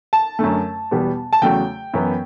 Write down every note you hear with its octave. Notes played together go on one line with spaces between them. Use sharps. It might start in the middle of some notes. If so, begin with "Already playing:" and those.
A5
F#2 D3 A3
E2 B2 G3 B3
A5
E2 C#3 F#3 A3 G5
F#2 E3 B3